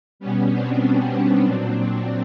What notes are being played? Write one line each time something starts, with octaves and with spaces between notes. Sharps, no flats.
B2 G3 B3 C#4
C4 D4
A#2 F#3